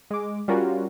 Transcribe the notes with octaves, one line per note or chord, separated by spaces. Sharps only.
G#3 D6
G3 C#4 F4 F#4 A#4